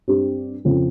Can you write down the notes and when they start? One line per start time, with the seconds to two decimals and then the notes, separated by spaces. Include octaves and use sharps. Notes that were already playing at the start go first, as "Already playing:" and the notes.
0.08 G2 G3 C4 G4
0.65 F2 C#3 F3 C4